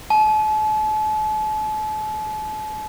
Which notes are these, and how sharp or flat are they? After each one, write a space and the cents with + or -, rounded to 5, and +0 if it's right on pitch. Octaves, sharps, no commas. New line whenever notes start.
A5 -40